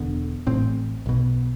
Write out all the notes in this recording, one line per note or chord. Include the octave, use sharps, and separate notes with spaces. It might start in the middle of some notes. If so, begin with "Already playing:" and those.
Already playing: E1 E2 D3 B3
A1 A2 C4
B1 B2